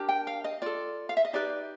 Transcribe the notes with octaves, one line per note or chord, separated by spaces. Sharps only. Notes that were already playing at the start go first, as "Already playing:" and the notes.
Already playing: D4 G4 A#4
G5
F5
D#5
F4 A4 D5
F5
E5
D#5
D#4 G4 B4 D5